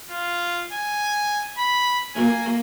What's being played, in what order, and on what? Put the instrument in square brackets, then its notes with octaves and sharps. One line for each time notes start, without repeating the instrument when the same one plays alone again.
[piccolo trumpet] F4
G#5
B5
[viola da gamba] A#3 [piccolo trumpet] G#5